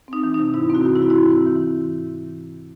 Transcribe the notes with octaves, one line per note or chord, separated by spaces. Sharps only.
C4 D#4
E3
C3 D#4
G#2 E4
C4 F#4
E3
E4
G#2 F#4
E4
G#2
C4
E3